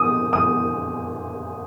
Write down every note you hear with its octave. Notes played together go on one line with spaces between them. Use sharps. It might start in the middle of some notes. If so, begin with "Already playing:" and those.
Already playing: D#6
D#6